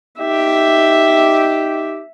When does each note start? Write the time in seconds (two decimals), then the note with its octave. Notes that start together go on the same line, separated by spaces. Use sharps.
0.19 D#4 G4 E5